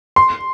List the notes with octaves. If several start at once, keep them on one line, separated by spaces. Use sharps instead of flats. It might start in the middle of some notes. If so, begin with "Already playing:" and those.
C6